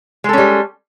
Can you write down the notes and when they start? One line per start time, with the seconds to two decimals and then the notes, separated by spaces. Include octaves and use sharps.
0.24 G#3
0.29 A4
0.33 C#4
0.38 G3